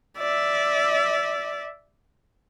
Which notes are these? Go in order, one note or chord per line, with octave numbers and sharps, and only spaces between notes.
D5 E5